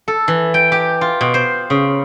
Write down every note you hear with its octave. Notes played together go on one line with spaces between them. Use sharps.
A4
E3
G5
G4
F4
B2
C5
C#3